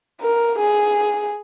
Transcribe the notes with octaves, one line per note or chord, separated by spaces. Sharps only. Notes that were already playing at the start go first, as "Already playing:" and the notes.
A#4
G#4